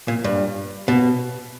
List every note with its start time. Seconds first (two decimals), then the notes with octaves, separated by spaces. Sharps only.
0.08 A#2
0.24 G2
0.88 B2